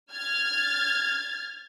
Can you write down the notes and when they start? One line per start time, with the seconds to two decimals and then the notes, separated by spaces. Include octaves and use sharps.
0.12 F6 G#6 A6